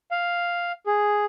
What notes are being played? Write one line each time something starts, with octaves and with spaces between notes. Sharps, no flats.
F5
G#4